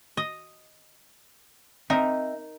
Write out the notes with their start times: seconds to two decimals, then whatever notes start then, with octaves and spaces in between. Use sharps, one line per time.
0.17 D#5
1.90 C4 D#4 A#4 D#5 E5